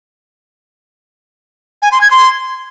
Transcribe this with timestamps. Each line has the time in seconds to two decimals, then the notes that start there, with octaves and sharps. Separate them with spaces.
1.82 G#5
1.92 C6
2.01 G#6
2.11 C6